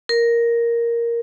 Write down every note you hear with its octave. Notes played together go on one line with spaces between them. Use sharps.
A#4